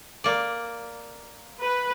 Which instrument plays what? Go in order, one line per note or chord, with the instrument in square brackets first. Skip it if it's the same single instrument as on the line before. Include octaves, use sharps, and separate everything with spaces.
[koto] A#3 D5
[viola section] B4